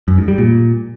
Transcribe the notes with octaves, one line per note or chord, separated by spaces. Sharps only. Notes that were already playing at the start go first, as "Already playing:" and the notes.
F#2
G#2
G3
A#2